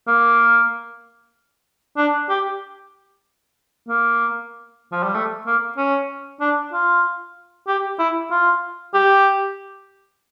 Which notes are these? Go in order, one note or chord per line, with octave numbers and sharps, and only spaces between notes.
A#3
D4
G4
A#3
F3
G3
A3
A#3
C#4
D4
F4
G4
E4
F4
G4